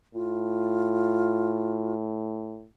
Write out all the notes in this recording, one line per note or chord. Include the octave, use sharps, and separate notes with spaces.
A2 F4